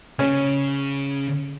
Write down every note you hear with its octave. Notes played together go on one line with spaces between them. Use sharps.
C#3 C#4